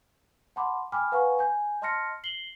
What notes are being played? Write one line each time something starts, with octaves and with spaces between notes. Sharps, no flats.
F#5 A5 B5 C6 D6
G5 G#5 B5 D6 F6
B4 F5 F#5 G#5 A#5 C#6
G#5 G6
D#5 A5 C6 F6 A#6 C#7
C7 F#7 G7